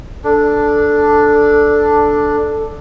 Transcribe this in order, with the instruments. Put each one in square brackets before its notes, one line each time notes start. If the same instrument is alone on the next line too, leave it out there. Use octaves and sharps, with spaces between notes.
[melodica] D4 [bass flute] A4